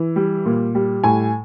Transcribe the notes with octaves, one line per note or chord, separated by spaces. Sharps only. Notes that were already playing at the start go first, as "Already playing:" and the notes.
Already playing: E3
G3
A#2
G3
A2 G#5